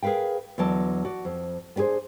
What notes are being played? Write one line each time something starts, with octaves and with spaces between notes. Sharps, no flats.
G#4 A#4 B4 F5 G5
E2 D3 F#3 D5 D#5 A5
F#4 D5
F2
B3 D4 G4 G#4 C5